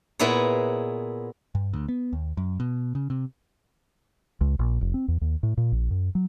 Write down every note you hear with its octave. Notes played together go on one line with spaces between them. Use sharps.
A#2 B3 E4 G#4 B4 C#5
G2
D2
B3
D#2
F#2
B2
C#3
C3
C#2
A#1
F1
C4
E2
D#2
A2
A#2
A#1
F#2
F#3